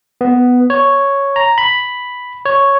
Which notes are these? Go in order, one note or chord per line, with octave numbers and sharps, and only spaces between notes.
B3
C#5
A#5
B5
C#5